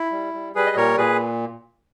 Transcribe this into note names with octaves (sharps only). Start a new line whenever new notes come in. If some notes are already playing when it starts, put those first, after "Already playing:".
Already playing: E4
G3
G3
G3 G#4 B4
D#5
A#2 A#4 C#5
A#2 G#4 B4